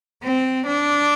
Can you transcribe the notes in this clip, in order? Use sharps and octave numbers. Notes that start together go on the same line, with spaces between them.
C4
D4